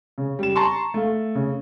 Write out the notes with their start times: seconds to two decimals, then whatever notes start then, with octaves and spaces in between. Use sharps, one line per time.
0.18 C#3
0.39 G3 E7
0.56 A5 A#5 C6 C#6
0.94 A3 F5
1.35 C#3